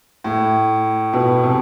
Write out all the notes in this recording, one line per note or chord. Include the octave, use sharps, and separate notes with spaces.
A2
B2
C3